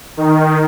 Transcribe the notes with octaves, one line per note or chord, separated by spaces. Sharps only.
D#3